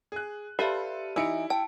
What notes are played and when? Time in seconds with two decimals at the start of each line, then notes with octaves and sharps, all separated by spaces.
0.12 G#4 F#6
0.59 G4 A4 B4 D5 E5 F5 B5
1.16 E3 D#4 E4 C#7 D7
1.50 G5 A5